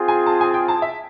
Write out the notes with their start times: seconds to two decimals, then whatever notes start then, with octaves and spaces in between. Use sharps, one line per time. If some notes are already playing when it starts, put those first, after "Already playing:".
Already playing: C4 F4 G#4
0.08 G#5
0.26 A5
0.41 G#5
0.54 G5
0.68 A5
0.82 E5